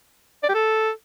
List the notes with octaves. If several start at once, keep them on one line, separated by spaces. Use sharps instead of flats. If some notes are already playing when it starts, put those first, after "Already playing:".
D5
G4
A4